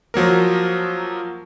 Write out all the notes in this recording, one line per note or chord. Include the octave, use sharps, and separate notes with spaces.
F3 F#3 A#3 A#4